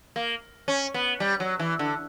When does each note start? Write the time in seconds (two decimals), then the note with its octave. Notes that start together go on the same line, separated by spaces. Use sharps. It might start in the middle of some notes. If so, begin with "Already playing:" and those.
0.16 A#3
0.68 C#4
0.94 B3
1.20 G3
1.40 F#3
1.60 E3
1.79 D3